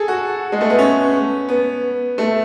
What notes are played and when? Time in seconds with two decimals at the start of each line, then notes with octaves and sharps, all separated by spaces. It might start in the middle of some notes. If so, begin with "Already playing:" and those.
Already playing: G#4 A4
0.08 F#4
0.52 G#3
0.61 A3
0.70 B3
0.79 C#4
1.49 B3
2.18 A3